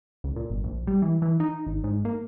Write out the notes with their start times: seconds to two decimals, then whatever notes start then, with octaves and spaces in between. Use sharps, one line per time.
0.24 C#2
0.36 A#2
0.50 G1
0.64 A#1
0.87 G3
1.02 E3
1.22 E3
1.40 D#4
1.67 G#1
1.84 G#2
2.05 A#3